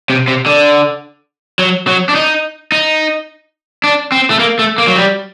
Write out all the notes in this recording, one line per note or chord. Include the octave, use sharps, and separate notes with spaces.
C3
C3
D3
F#3
F#3
D4
D#4
D#4
D4
C4
A3
A#3
A3
A#3
F#3
G3